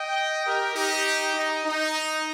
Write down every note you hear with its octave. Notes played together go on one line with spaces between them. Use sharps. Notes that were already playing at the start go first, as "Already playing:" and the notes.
Already playing: D#5 G5
G4 A#4
D#4 G4
D#4
D#4